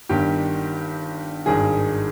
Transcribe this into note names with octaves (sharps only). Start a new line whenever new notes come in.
G1 G2 D#3 G4
G#1 G2 D#3 G#4